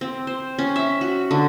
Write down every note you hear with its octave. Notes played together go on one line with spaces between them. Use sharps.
C4
C5
C#4
E5
F#4
D3